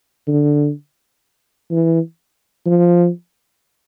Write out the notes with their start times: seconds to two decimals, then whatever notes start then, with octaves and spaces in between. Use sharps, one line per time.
0.27 D3
1.71 E3
2.66 F3